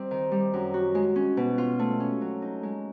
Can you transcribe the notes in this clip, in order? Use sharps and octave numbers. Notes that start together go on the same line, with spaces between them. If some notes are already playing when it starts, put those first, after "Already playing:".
Already playing: G3 C4 D#4
D#3
G3
F#2
F#4
G#3
C#4
B2
F4
A3
C#4
F#3
D#4
G#3